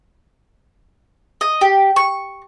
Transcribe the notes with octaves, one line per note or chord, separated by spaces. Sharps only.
D#5
G4
C#6